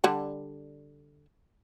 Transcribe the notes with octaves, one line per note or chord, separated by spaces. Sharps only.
D3 G3 D4